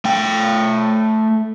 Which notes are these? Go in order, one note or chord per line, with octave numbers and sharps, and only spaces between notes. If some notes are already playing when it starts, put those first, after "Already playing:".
A3 G5